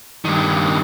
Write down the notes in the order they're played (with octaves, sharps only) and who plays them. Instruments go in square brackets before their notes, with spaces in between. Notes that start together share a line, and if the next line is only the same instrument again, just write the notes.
[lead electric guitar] G2 D#3